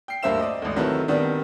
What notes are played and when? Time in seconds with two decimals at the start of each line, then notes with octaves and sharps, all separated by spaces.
0.08 G5 C7
0.23 D2 G2 A#3 C5 E5 E7
0.39 D5 D#5
0.62 G#1 D2
0.76 C3 D#3 F#3 E4 A4 B4
1.08 D#3 G3 B3 C4 D4